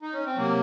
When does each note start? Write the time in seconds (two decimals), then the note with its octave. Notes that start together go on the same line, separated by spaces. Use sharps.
0.02 D#4
0.13 C#4
0.26 C4
0.37 C3 F#3 A#3